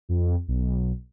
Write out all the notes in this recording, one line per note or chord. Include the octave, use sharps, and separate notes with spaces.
F2
B1